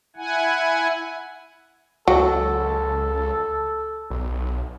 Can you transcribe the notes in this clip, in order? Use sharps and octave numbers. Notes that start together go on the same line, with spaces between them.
E4 F#5 G#5
C#2 F#3 A4
B1